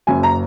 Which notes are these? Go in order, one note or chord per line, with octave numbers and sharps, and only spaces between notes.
F#1 F#2 C#3 G#5
A#5